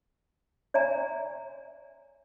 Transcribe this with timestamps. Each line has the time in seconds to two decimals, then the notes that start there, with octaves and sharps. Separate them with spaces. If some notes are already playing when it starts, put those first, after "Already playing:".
0.74 C#5 D5 E5 G#5 A#5